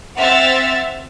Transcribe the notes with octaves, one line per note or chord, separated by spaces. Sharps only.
C4 E5 F#5 F6 A6